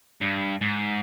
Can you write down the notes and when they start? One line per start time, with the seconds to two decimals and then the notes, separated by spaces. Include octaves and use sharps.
0.21 G2
0.61 G#2